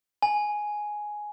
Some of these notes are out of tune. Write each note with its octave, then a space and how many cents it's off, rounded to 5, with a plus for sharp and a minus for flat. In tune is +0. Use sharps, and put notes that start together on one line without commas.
G#5 +5